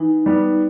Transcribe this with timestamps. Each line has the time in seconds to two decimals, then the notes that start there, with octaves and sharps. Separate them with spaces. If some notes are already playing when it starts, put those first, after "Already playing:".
Already playing: E3 D#4
0.26 G3 B3